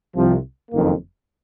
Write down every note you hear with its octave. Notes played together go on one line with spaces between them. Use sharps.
C2 C3 F3
F#1 F2 D#3 A#3